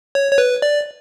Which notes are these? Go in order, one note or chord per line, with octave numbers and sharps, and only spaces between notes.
C#5
C#5
B4
D5